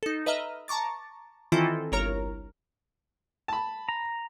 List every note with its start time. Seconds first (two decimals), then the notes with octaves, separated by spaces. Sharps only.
0.03 D#4 A4
0.26 B4 D#5 E5 A#5 F6
0.68 A5 A#5 C#6 D6 A6
1.52 D#3 E3 C4 E4 F4 A4
1.92 G1 C2 A#4 C#5 A#5 F6
3.48 A5 B5
3.89 A#5